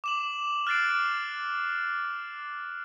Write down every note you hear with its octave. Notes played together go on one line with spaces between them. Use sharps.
D6 E7 F#7
F6 F#6 A6 C7 D7